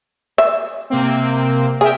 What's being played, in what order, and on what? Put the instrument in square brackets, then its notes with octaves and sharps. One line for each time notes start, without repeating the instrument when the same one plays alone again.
[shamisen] E5
[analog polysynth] C3 A#3 C4
[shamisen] G#4 [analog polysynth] A#4 E5 G5